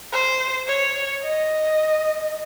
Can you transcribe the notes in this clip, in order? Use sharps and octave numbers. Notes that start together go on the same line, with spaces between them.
C5
C#5
D#5